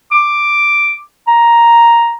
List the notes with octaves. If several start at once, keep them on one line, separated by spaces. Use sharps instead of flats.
D6
A#5